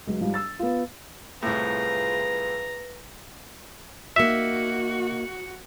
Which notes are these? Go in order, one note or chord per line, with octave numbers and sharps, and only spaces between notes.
C#2 F#3
G#2 F3 G3
E6 A6
B3 F4
C2 A2 F4 G#4 B4 A#5
A#3 D#4 F#4 E5